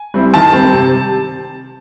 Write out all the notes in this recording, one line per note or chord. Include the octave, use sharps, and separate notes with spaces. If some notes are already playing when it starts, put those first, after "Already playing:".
Already playing: G#5
G3 C4 E4
D#3 A5
G3 C4
C3